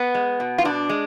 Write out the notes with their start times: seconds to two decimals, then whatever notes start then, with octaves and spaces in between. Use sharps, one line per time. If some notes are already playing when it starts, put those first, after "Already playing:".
Already playing: B3
0.15 G#3
0.40 B2
0.58 F4
0.65 B2 D4
0.89 G#3